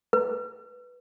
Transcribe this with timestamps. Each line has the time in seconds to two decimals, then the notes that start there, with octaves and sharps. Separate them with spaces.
0.13 B4